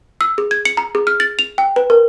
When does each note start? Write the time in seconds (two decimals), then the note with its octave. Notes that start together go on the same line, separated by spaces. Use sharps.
0.21 E6
0.38 G#4
0.51 G#6
0.65 C#7
0.77 A#5
0.95 G#4
1.07 F6
1.20 A6
1.39 F7
1.58 G5
1.76 B4
1.90 A#4